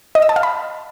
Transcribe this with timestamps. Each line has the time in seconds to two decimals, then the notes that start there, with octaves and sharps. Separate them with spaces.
0.15 D#5
0.22 E6
0.29 A5
0.36 F5
0.43 B5